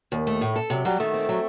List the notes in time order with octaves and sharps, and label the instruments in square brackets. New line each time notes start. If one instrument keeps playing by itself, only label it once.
[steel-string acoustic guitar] D#2 [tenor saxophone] D#3
[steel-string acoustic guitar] A3
A2
A4
[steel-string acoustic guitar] C3 [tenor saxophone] F#3
[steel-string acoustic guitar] F#3 [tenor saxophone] G3
[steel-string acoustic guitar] D#3 [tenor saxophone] A3
[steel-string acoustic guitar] C4
F#3